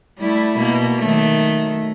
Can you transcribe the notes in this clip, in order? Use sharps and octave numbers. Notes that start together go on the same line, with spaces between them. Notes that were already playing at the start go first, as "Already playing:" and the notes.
G3 A3 E4
B2 A#3
D#3 F#3 A3